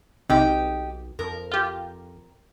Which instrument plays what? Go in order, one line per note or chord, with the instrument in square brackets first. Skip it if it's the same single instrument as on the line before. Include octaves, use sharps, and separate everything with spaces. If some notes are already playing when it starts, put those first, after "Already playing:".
[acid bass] B1 [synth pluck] C3 [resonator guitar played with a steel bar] D#4 G4
[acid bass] F2 [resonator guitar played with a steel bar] A#4
[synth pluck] F4 G4